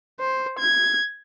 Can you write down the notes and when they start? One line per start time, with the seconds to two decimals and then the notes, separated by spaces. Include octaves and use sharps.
0.20 C5
0.59 G#6